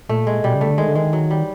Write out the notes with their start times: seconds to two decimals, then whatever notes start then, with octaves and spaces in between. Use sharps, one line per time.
0.09 A#2 A3
0.27 G#3
0.44 B2 G3
0.55 C#3
0.61 A3
0.67 D3
0.78 D#3 G#3
0.88 D3
0.95 D#3 G#3
1.13 F#3
1.31 G3